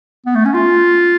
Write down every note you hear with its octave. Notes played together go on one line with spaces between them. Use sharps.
B3
A3
C#4
F4